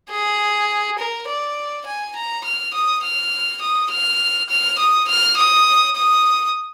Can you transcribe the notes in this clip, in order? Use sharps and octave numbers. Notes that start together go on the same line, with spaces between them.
G#4
A#4
D5
G#5
A#5
F6
D#6
F6
D#6
F6
F6
D#6
F6
D#6
D#6